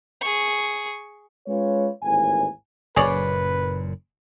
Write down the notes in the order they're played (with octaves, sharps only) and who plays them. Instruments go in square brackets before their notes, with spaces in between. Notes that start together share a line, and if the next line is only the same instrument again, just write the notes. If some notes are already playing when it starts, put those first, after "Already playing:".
[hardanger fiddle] G#4 C#6
[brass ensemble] G#3 C#4 F4 B4 C#5
G#1 D#2 A2 E3 G#5
[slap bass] F#1 F#2 A#2 [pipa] G#4 C#5 D5 [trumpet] B4